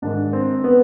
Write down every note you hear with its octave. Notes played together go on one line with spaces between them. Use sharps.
G#2 D#3 G#3 D4
C4
B3